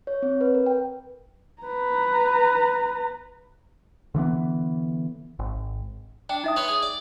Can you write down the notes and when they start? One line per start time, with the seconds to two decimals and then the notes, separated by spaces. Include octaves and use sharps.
0.07 C#5
0.22 C4
0.41 B4
0.55 A#4
0.66 G5
1.63 B4 A#5
4.15 D3 E3 G#3 B3
5.39 G#1
6.29 D4 G5
6.44 D#4 E5 D#6
6.56 B4 C#5 C6
6.68 G#4
6.83 D5